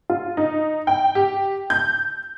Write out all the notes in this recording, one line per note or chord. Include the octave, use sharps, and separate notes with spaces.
F4
D#4
G5
G4
G6